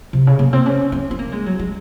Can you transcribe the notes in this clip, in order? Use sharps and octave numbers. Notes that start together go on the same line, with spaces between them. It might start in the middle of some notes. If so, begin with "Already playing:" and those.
C3
C#3
A#3
C4
C#4
C4
C4
A#3
G#3
F#3
G#3